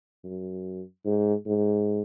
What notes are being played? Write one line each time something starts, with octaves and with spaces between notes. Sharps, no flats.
F#2
G#2
G#2